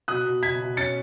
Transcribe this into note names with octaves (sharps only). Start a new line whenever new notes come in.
B2 D#6 F#6
B2
B2 G#6 B6
B2
C#4 A6 C#7